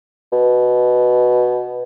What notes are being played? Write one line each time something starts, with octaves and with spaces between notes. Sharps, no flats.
B2